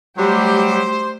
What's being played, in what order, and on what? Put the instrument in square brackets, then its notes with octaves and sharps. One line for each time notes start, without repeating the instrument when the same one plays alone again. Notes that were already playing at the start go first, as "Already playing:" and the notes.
[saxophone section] F#3 G3 [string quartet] A3 G4 [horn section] C5